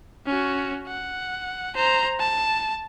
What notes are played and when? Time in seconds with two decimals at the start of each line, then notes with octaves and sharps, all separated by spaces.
0.26 C#4 F#4
0.87 F#5
1.75 C5 A#5
2.19 A5